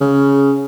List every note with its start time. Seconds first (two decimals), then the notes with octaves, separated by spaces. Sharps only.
0.01 C#3